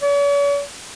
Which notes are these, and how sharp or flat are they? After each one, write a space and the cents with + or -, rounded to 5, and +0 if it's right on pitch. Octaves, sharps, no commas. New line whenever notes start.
C#5 +45